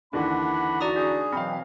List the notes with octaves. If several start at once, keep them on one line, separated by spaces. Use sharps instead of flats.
D#2 D3 E3 D4 F#5 B5
D#4 F#4 D5 A#5 D#6
D4 G#4
B2 E3 F#3 C4 F5 G5 B5